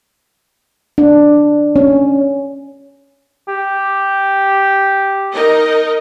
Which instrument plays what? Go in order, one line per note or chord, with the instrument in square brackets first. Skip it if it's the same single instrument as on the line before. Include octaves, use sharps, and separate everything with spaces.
[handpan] D4
C#4
[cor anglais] G4
[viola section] D#4 A#4 D#5